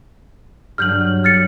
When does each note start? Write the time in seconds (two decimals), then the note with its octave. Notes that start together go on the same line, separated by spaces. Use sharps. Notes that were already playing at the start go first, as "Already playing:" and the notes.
0.78 G2 F#3 F6 G6 F#7
1.24 G4 F6 A6 C#7